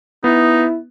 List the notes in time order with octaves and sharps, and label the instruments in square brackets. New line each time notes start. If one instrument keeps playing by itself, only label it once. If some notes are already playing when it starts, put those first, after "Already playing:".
[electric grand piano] B3 [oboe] D#4 [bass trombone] E4